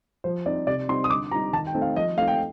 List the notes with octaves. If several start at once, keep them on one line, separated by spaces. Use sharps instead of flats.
F3 C5
C4 D#4 D5
C3 D5
G3 C4 D#4 C6
D#6
D3 D6
G3 C4 D#4 A#5
D#3 A5
G5
A3 C4 D#4
F5
F3 D#5
A3 C4 D#4 F5
G5